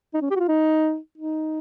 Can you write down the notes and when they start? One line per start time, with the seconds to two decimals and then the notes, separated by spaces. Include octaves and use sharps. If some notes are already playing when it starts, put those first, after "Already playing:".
0.14 D#4
0.22 C#4
0.30 G4
0.36 F#4
0.39 F4
0.48 D#4
1.18 D#4